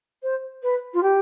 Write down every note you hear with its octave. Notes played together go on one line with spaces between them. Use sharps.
C5
B4
F4
G4